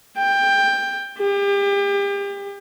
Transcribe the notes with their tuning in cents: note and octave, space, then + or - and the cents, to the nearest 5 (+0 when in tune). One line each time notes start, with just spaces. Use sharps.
G5 +15
G4 +35